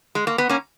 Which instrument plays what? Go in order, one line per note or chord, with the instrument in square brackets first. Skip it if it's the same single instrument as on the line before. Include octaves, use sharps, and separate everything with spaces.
[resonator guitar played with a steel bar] G#3
A#3
B3
A#3 C#4